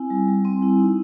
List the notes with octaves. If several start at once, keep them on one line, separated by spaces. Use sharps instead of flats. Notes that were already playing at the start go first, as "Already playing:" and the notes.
Already playing: C4 E4 G#5
G3
G3
C4
E4
D#4